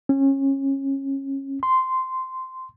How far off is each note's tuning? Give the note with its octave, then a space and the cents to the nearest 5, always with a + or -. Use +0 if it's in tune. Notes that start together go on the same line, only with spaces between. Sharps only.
C#4 -25
C6 -10